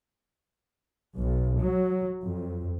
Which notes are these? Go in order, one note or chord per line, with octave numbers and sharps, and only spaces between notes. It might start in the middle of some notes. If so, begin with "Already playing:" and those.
B1
F#3
F2